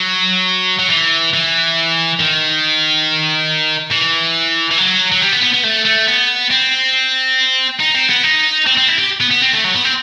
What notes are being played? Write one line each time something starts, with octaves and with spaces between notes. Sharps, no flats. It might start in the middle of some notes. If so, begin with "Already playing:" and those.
Already playing: F#3
F#3
E3
E3
D#3
E3
E3
F#3
F#3
G3
B3
B3
B3
A3
A3
B3
C4
D#4
C4
B3
D#4
C4
C4
E4
G4
B3
B3
C4
A3
F#3
B3
C4